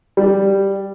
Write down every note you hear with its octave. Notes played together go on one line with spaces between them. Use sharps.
G3